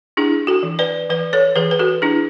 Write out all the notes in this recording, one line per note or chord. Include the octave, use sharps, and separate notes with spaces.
D4 E4 G#4
F#4 A4
E3
B4 D5
E3 B4 D5
A4 C#5
E3 G#4 B4
B4
F#4 A4
D4 E4 G#4